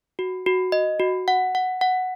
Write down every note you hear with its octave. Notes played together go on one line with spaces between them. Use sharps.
F#4
F#4
D#5
F#4
F#5
F#5
F#5